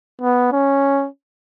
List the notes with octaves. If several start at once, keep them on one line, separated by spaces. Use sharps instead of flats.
B3
C#4